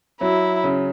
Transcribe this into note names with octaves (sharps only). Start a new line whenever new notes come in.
F#3 E4
C#3